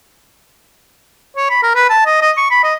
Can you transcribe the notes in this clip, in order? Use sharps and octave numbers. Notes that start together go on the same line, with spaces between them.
C#5
B5
A#4
B4
A5
D#5
D#5
C#6
B5
D#5